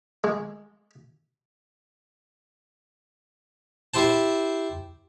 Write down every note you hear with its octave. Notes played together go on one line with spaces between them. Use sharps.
G#3
E4 G4 C5 A5